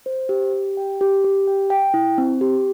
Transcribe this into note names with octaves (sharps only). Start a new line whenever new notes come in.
C5
G4
G4
G5
G4
G4
G5
G5
E4
C4
G4